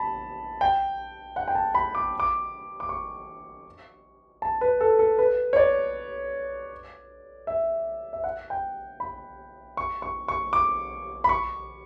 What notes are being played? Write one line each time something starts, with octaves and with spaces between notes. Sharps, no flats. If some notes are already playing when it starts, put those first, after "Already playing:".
Already playing: A5 B5
G5
F#5
G5
A5
B5
D6
D6
D6
C#6
A5
B4
A4
A4
B4
C#5
D5
E5
E5
F#5
G5
B5
C#6
C#6
C#6
D6
B5
C#6